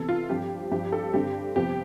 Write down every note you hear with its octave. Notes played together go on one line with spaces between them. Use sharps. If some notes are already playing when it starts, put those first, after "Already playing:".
Already playing: C3 E3 B3 A4
F4
G2 F3 C4 G4
G2 F3 C4 G4
A4
G2 D3 G3 C4 G4
F2 C3 F3 B3 G4